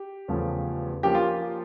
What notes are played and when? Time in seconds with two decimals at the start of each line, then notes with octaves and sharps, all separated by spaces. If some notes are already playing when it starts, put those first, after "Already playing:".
Already playing: G4
0.28 E2 C#3 F3 A3 C#4
1.03 F3 A#3 C#4 G4
1.15 F4